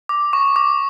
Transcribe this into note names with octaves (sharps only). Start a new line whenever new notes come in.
D6
C#6
D6